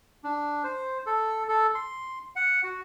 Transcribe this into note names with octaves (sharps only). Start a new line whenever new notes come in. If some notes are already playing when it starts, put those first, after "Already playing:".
D4
C5
A4
A4
C6
F#5
F#4